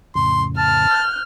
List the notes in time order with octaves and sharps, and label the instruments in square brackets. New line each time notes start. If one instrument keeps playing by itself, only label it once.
[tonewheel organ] F2 A2 C#3 [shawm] C6
[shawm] A5 [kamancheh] F6
[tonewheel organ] F#6 G6